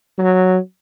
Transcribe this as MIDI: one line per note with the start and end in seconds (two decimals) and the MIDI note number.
0.18 0.58 54